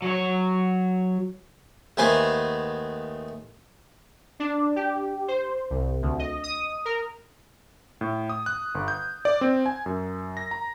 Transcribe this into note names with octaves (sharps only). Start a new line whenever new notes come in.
F#3 C#5
D#2 A3 B3 B4 C5 G#5
D4
G4
C5
C2
D2
D#5
D#6
A#4
A2
D#6
F#6
G1
G6
D5
C4
G#5
F#2
A#6
A#5